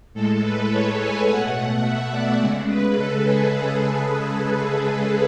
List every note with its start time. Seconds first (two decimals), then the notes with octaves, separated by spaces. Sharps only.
0.14 A2 G#3 A4
0.42 B4
0.70 C#5
0.99 G#5
1.26 B2 A3 F#5
1.82 E5
2.10 D5
2.38 C#3 G#3
2.67 B4
2.95 A4
3.23 G#4